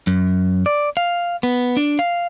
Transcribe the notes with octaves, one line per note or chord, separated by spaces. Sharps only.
F#2
D5
F5
B3
D4
F5